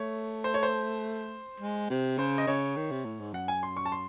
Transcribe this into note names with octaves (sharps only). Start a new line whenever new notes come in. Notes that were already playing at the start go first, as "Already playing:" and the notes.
Already playing: A3 C#5
C5
C#5
C5
G#3
C3
C#3 C5
D#5
C#3 C#5
D#3
C3
A2
G#2
F#2 F#5
G#5
C6
C#6
A5
C6